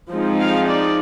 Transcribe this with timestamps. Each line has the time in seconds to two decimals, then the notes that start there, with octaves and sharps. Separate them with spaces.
0.10 F3 G#3 C4 D#4
0.39 F5
0.67 D5